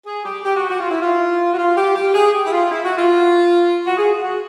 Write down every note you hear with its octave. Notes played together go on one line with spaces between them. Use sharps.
G#4
G4
G4
F#4
F#4
F4
E4
F4
F#4
F4
G4
G4
G#4
G4
E4
F4
E4
F#4
F4
F#4
G#4
F#4